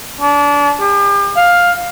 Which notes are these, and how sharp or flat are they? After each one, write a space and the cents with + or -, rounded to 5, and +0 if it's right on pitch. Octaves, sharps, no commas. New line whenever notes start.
D4 -30
G4 +40
F5 +10